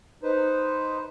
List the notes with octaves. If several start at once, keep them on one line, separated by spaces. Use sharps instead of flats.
D#4 B4 C5